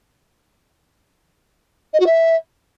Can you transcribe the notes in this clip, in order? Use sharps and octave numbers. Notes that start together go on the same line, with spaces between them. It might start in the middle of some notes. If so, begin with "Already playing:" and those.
D#5
F#4
E5